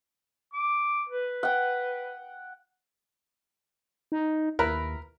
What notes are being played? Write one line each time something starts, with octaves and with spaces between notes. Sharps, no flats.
D6
B4
F#5 G5
D#4
D#2 E4 A#4 B4